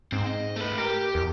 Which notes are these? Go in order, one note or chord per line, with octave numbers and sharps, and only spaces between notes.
G#2 C4
D#5
A3 B4
G4 A#4
E2